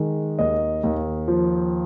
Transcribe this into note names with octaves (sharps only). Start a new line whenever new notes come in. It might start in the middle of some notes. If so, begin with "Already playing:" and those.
Already playing: D#3 G#3
D#2 D#5
D#2
F3